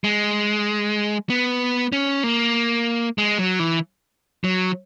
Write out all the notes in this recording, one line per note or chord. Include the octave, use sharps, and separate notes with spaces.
G#3
B3
C#4
A#3
G#3
F#3
E3
F#3